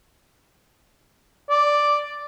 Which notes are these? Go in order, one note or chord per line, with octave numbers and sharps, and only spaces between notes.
D5